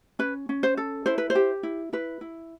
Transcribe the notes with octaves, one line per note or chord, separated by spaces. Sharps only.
C#4 B4
C#4
C5
A4
E4 C5
B4
C5
G4
E4
E4 B4
E4